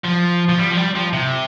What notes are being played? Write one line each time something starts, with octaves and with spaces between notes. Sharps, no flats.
F3
F3
G3
F3
G3
F3
C3